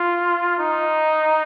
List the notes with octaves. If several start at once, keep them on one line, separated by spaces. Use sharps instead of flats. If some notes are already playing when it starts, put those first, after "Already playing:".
Already playing: F4
D#4